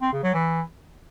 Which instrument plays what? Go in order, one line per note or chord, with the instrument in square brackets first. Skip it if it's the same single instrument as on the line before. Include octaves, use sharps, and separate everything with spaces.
[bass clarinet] C4
C#3
F#3
E3